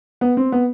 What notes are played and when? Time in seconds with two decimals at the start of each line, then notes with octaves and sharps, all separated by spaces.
0.21 B3
0.37 C4
0.52 B3